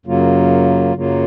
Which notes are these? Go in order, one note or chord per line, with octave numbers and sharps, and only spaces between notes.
F#2 C#3 F#3 A#3 F4
F#2 C#3 F#3 A#3 F4